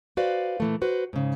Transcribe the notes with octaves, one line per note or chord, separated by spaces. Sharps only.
F#4 B4 C5 D5 F5
A#2 E3 A3
F#4 B4 C5
G#2 C#3